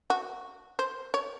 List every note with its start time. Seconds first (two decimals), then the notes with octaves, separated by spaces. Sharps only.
0.10 F#4
0.79 C5
1.14 C#5